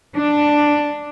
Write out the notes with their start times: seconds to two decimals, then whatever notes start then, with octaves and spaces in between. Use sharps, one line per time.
0.15 D4